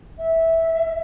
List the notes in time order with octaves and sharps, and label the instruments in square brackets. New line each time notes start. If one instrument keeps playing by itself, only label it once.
[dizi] E5